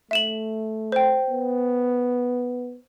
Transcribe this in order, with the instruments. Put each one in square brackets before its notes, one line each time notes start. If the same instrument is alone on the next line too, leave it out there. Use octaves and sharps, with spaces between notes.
[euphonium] A3 [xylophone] E5 E7 F#7
[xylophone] C5 G5
[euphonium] B3